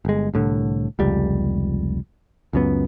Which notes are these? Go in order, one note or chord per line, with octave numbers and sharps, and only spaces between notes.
G1 G#3
C2 A2 D3
F1 C#2 G3
C#2 F#2 B3